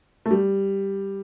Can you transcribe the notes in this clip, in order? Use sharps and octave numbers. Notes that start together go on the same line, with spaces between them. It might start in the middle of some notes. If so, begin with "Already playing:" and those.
A3
G3